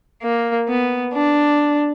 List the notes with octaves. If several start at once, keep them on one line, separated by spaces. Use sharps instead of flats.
A#3
B3
D4